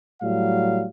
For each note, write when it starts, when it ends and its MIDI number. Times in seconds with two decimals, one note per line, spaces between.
0.22 0.86 45
0.22 0.86 54
0.22 0.86 55
0.22 0.86 77